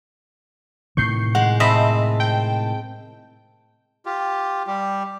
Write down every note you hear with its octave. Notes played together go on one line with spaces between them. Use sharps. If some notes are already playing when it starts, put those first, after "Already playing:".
A2 C3 D#3 C#6 G6 C7
G#3 F#5
C4 D#5 E5 A5 B5
G5
F4 G4
G3 G4